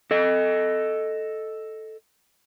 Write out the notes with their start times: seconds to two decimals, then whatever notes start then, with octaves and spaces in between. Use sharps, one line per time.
0.11 A4 D#5